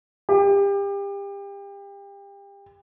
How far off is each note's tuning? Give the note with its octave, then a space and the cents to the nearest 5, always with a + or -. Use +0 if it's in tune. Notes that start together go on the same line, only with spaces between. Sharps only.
G4 +30